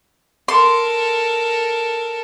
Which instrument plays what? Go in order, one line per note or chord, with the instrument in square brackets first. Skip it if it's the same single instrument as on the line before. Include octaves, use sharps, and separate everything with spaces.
[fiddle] A4 A#4 [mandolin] C6